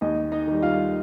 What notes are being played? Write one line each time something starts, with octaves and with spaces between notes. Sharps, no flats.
D#2 D#4 D#5
D#4 D#5
D#3 G3
F4 F5